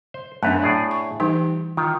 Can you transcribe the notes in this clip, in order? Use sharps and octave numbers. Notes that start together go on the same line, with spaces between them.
C5
F#2 A3 B3 D4 B4 A5
A2 G#4 D5
C#6
E3 G3 D#4 G4
D#3 F4